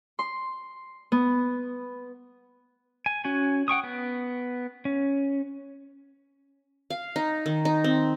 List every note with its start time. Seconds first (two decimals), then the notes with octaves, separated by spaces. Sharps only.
0.19 C6
1.12 B3
3.06 G#5
3.25 C#4 F#4 G#5
3.68 F#5 G5 C#6 D#6
3.83 B3
4.85 C#4
6.90 F5
7.16 D#4
7.46 D#3
7.65 D#4
7.84 C4